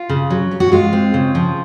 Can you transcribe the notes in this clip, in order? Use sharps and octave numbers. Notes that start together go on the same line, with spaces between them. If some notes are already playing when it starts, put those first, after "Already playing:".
Already playing: F4
C#3
F#3
C#4
F#4
G#3 F4
C4
C#3
F3